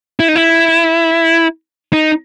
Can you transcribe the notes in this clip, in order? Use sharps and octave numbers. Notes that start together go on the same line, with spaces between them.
E4
D#4
E4
D#4